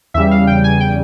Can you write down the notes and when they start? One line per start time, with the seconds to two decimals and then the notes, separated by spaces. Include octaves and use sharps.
0.14 E2 C#3 G3 E5
0.31 F5
0.47 G5
0.64 G#5
0.80 G5